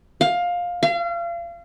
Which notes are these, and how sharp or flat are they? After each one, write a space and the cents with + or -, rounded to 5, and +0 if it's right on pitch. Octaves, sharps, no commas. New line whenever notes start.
F5 +15
F5 -35